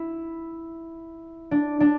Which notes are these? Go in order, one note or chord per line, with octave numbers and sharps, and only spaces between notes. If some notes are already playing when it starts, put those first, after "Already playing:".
Already playing: E4
D4
D4